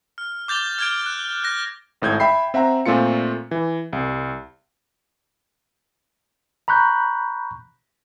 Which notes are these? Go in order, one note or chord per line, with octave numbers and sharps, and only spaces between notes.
F6
D6 G6 A6 F7 G7
F6 G#6 D7
F#6
F#6 A#6
G#1 A2 G6 G#6
E5 G5 B5 C7
C4 E5 F#5 A#5
A#2 A3 C4 F4 C#7
E3
C2
A#5 B5 C#6 F#6 G6